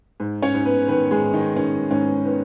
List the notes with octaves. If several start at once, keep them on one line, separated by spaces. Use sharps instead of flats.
G#2
C#4 C#5
G#2
B3 B4
D#3 B3 B4
G#3 G#4
G#2
D#3 D#4
D#3 C#4
G#2 C#4
D#3 B3